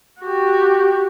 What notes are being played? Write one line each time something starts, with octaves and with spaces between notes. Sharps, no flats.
F#4 G4